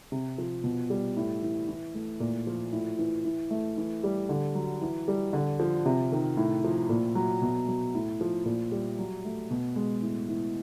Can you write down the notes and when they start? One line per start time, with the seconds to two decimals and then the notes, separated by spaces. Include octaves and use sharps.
0.12 C3
0.38 F3
0.64 B2
0.90 G3
1.17 A2
1.42 E3
1.69 E3
1.95 A3
2.20 A#2
2.47 F3
2.73 A2
2.99 E3
3.24 E3
3.51 A3
3.78 E3
4.04 G3
4.29 D3
4.55 F#3
4.82 E3
5.08 G3
5.33 D3
5.60 F3
5.86 C3
6.12 D#3
6.37 A2
6.64 F3
6.89 A#2
7.15 F#3
7.42 B2
7.68 F#3
7.95 A2
8.21 F3
8.46 A#2
8.72 G3
8.99 F#3
9.25 A3
9.51 B2
9.76 G#3
10.02 A2
10.29 E3